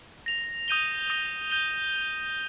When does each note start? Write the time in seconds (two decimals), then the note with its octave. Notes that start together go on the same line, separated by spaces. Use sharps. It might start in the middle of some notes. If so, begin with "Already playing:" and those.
0.26 A#6 F7
0.68 D#6 G6 D#7 G7
1.10 D#6 A#6 D#7 G7
1.51 G6 D#7 G7